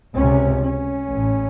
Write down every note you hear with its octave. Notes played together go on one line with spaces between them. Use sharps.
C#2 C3 C#4
C#4
A1 A2